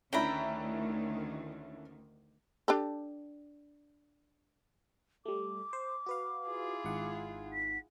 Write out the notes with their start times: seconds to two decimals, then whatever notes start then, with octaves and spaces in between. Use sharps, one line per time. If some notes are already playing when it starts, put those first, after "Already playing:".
0.13 D2 D#3 C#4 D4 E4 G5 A#5 B5
2.68 D4 G4 A4
5.25 G3 A3 D6
5.73 C5
6.06 F#4 B4 F5
6.47 E4 F4 G#4
6.85 G#1 D#4 F#5
7.53 B6